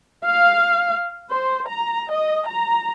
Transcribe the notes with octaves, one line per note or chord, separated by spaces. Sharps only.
F5
C5
A#5
D#5
A#5